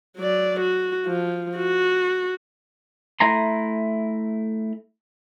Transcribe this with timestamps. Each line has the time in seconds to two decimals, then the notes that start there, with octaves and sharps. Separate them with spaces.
0.18 F#3 D5
0.60 F#4
1.06 F3
1.57 F#4
3.20 A3 E4 G#5 A#5 C6